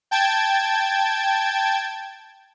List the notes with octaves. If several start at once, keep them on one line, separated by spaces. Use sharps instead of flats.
G5 A5 G#6